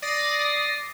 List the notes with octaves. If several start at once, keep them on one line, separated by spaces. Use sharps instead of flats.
D5 D#6 A6 A#6 C7